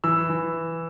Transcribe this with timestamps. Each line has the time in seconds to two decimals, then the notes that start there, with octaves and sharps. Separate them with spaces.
0.04 E3 E6
0.29 E3